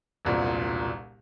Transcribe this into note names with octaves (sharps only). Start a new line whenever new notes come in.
E1 C2 A#2